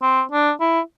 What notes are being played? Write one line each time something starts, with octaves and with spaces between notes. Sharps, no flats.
C4
D4
E4